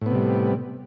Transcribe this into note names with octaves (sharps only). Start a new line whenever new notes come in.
A2 C3 G3 B3